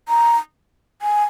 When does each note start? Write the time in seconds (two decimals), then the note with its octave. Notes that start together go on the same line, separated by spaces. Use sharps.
0.09 A#5
1.02 G#5